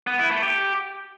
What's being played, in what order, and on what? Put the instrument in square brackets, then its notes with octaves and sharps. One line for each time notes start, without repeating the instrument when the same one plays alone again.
[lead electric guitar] B3
E4
A3
G4